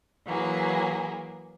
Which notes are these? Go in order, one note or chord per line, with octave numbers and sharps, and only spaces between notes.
E3 F#3 A#3 G#4